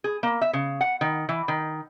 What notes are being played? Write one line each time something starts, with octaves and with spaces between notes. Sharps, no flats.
G#4
A#3
E5
C#3
F#5
D#3
E3
D#3